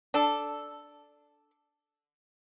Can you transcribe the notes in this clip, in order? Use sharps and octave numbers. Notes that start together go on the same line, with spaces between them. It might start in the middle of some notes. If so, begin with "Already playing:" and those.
D4 A4